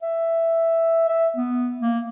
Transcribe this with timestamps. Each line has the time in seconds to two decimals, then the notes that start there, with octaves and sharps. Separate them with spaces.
0.02 E5
1.08 E5
1.36 B3
1.81 A#3